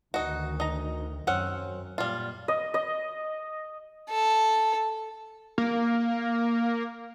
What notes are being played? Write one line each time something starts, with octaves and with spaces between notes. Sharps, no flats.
D2 D#3 D#4 F#4
D#4 A#5
F#2 C4 C#4 F#5
A#2 G3 F4
D#5
D#5
A4
A#3